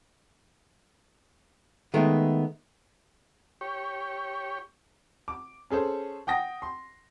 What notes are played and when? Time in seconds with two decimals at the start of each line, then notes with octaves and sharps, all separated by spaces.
1.94 D#3 G#3 A3 B3
3.61 G4 C#5
5.28 D6
5.70 C#4 G#4 A4 C5
6.27 F#5 G5 D#6 A#6
6.62 C6